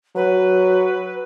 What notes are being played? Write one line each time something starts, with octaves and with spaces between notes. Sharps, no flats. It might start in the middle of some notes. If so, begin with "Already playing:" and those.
F#3 B4